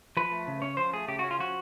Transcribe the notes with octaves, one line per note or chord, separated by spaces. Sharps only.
F3 B4
A3
C#3
C#4 C#5
F3 C5
A3 G#4
C#3 G4
C#4 F#4
F4
F3 F#4